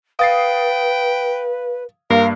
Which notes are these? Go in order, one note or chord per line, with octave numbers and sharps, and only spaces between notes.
B4 F5 G5 D#6 A6 C7
G2 A#3 A#4 F5 C7